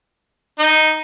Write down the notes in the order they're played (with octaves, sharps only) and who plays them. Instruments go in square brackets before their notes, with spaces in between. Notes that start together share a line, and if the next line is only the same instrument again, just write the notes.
[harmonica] D#4